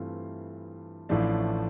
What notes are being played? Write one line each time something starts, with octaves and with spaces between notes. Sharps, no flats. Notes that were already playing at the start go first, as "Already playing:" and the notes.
Already playing: G2 E3 A3 C4 F4
A1 A2 F3 A3 D4